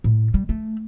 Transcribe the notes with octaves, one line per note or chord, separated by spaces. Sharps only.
A2
G3
A3